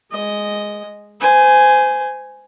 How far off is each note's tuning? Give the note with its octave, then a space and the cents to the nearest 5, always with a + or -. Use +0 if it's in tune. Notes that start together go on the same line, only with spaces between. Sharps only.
G#3 +0 D#5 +0
C5 -25 G#5 +0